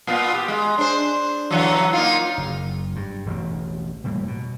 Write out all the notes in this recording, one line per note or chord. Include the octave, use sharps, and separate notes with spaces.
A#2 B3 F4
G4
G#3
D4 C5
D3 E3 F#3
A#3 D#4 F4
F#1
G2
E1 A1 B2
F1 A2 G3 A#3
B2